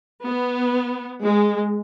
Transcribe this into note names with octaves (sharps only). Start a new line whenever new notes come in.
B3
G#3